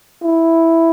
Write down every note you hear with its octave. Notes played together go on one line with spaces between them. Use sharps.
E4